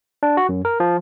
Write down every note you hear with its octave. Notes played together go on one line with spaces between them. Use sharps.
D4
F#4
F#2
A#4
F3